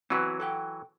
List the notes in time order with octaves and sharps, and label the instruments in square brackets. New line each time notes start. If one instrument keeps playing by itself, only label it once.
[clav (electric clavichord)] E3 F#3 [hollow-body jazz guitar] C4 F#4 B4
[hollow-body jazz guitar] A4 F#5 G5